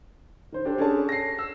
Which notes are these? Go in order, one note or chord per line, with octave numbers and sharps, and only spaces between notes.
D#3 C5
D4 G4 A4 C5
C#4 D4 G#4 A4 D5 A5
A#6 C7
E6